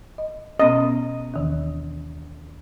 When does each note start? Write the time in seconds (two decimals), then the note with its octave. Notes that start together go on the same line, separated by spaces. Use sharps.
0.18 D#5
0.60 B2 B3 C#4 D#5
1.34 D#2 D#3 E3